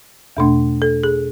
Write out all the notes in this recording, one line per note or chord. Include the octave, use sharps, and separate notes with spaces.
E2 B2 A3 D4
A4
G#4